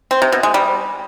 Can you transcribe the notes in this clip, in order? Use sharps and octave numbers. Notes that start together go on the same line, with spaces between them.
C4
C3
B2
G#3
G3